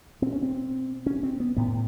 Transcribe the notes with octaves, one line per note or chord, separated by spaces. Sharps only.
B2 C4
C#4
C4
C#4
C4
B3
A2 B3